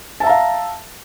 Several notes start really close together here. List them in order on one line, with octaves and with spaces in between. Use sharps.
A5 E5 A#5 F5